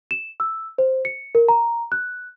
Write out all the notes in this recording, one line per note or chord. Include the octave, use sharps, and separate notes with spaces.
E7
E6
C5
C#7
A#4
A#5
F#6